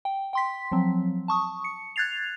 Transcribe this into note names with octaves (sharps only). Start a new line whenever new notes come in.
G5
G5 C6 B6
F3 F#3 C4
A5 C#6 D#6
C#7
F#6 G#6 A6 C7 F7